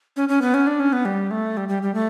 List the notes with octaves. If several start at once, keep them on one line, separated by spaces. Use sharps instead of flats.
C#4
C#4
B3
C#4
D4
C#4
B3
G3
A3
G3
G3
G3
A3